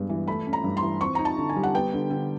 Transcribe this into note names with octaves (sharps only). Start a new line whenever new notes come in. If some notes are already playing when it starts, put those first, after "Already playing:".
Already playing: G2 G#3 B3
E3
A3 B5
C#4
A#5
G2
C6
E3
C4 C#6
D#4 A#5
A5
D3
G#5
G3
F#5
B3 G5
D3
D3